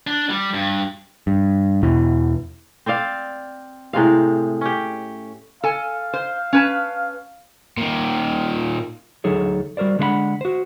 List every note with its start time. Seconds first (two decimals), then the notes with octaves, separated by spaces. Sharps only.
0.07 D4
0.30 G3
0.54 G2
1.27 G2
1.83 E2 B2 E3
2.86 C4 C5 D5 F5
3.93 A2 C3 G#3 F5
4.61 C#4 G4
5.64 A4 F5 G#5
6.14 C5
6.53 C#4 B4 A5
7.77 A#2 D#3
9.24 D2 F#3 D#4 G#4 A4 C#5
9.77 G3 F#4 A#4 C5 D5
9.99 D3 G#3 D4 E4 F#5 B5
10.41 F#4 C5